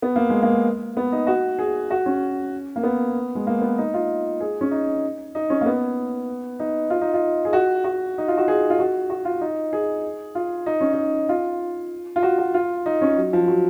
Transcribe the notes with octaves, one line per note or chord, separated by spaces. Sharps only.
B3
A#3
G#3
A#3
B3
D#4
F#4
G#4
F#4
C#4
A#3
B3
G#3
A#3
B3
D#4
F4
G#4
C#4
D#4
D#4
C#4
A#3
B3
D#4
F4
D#4
F4
G#4
F#4
F#4
D#4
F4
F#4
G#4
F4
F#4
F#4
F4
D#4
G#4
F4
D#4
C#4
D#4
F4
F4
F#4
F#4
F4
D#4
C#4
F#3
F3
F#3